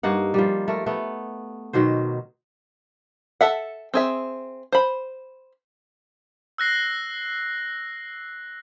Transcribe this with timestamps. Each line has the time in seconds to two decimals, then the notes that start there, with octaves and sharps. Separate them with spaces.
0.03 G2 A#3 D#4 F#5
0.34 F3 G3
0.68 A3 A#4
0.86 A3 B3
1.73 B2 D#3 F#3 C5
3.41 A4 E5 F#5
3.94 C4 G#4 E5
4.72 C5 B5
6.58 E6 F#6 A#6 C7